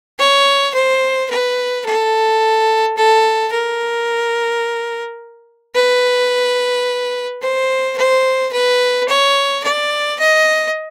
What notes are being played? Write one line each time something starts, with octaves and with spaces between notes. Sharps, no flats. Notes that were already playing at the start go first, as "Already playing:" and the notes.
C#5
C5
B4
A4
A4
A#4
B4
C5
C5
B4
C#5
D5
D#5